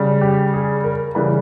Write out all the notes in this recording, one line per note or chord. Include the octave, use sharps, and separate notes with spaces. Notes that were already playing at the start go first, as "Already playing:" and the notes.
Already playing: C#3 G3
G4
G#4
A#4
C#3 E3 G3 B4